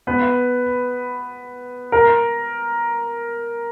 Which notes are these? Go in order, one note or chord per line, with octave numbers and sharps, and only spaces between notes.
B3 B4
A#4